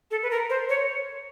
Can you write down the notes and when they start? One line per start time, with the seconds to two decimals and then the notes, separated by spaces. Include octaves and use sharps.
0.11 A4
0.23 B4
0.31 A#4
0.50 C5
0.69 C#5